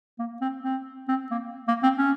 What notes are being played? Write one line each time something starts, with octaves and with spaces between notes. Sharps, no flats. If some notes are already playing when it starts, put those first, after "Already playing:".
A#3
C4
C4
C4
A#3
A#3
C4
C#4